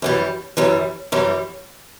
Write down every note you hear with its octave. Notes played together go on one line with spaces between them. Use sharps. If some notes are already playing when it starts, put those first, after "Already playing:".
F#2 E3 G3
F#2 E3 G3
F#2 E3 G3